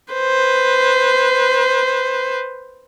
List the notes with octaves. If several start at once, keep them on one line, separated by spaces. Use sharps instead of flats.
B4 C5